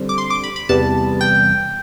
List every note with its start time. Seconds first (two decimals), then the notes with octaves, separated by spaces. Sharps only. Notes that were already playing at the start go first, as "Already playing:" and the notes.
Already playing: D3 G3 C4
0.09 D6
0.18 C6
0.30 D6
0.44 B5
0.56 B5
0.69 E2 C3 G3 B3 A5
1.21 G5